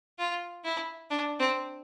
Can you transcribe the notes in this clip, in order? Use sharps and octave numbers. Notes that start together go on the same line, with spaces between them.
F4
E4
D4
C4